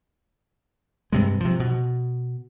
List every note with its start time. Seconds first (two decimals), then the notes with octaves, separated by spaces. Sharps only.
1.12 G2 C3 G#3
1.40 C3 F3
1.60 B2